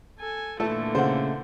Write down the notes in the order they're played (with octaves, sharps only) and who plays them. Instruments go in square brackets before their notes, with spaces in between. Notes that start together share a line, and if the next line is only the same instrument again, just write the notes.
[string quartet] A4 G#5
[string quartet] A#2 D3 E3 [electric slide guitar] A3 [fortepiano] A4
[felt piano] C#3 [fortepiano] C5 F#5